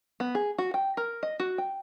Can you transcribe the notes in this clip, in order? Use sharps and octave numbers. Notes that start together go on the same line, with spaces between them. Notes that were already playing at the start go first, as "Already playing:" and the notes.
B3
G#4
F#4
G5
A#4
D#5
F#4
G5